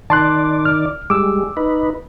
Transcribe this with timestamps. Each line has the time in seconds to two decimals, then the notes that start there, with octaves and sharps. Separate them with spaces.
0.10 D#3 D5 A5 C6 F#6
0.65 F6
1.10 G3 G#3 D6 E6
1.57 D#4 B4